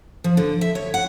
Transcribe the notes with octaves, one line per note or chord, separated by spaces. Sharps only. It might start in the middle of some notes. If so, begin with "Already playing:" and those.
F3
D3
E5
C#5
F#5